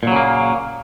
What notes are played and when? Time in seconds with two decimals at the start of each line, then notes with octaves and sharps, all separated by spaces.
0.03 A#2
0.07 F#3
0.12 C#3
0.16 A#3